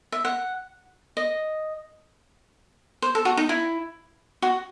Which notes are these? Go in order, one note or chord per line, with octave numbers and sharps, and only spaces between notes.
E5
F#5
D#5
C5
A4
F#4
D#4
E4
F#4